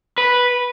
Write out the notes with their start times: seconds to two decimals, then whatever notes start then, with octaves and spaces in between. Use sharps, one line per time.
0.18 B4